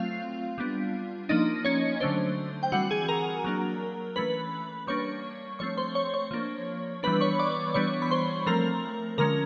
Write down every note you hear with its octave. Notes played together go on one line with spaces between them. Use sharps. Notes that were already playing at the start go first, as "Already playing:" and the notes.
Already playing: F#3 A3 C4 F4 F5
G3 B3 D4
F3 A#3 D4 D#4 D#5
C#4 C#5
D3 F#3 A3 D4 C5
G5
E3 G3 C4 F#4 F#5
G#4 G#5
A#4 A#5
F#3 A#3 D4
E3 A3 C#4 B4 B5
G3 A#3 D4 C#5 C#6
F3 A3 C4 C#5 C#6
C5 C6
C#5 C#6
C#5 C#6
F3 A#3 D4
E3 G3 B3 D4 B4 B5
C#5 C#6
D5 D6
E3 G3 B3 D4 C#5 C#6
B5
C5 C6
F3 A3 C4 A#4 A#5
D3 F3 G#3 C#4 A#4 A#5